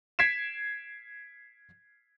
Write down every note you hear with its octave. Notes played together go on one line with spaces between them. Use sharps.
G#6 B6 C7 D7 E7